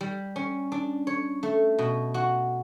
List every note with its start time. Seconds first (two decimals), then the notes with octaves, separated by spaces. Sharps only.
0.01 G3
0.36 C#4
0.72 D4
1.07 C#5
1.43 A3
1.78 B2
2.14 F#4